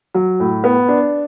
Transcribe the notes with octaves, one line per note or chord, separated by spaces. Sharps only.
F#3
A2
B3
D4